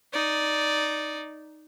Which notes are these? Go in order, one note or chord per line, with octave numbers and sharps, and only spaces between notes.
D#4 D5